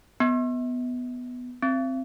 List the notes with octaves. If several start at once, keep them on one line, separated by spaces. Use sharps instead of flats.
B3
C4